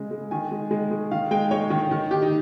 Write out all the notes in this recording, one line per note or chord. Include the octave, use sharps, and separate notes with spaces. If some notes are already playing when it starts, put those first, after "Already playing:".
Already playing: C#3 G#3
G#3
D#3 G#5
G#3
G#3
G#3
D#3 F5
G#3 G5
G#3 C#5
D#3
D#3
D#3 G4
D#4